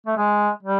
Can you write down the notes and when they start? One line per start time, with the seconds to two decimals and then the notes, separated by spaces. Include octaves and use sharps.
0.07 A3
0.17 G#3
0.63 G3